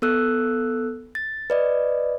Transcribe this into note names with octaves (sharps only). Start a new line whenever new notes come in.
B3 A4 E6 F#6
A6
B4 D5 D#5